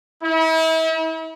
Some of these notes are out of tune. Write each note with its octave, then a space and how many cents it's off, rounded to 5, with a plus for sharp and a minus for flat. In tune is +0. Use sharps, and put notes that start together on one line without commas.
E4 -40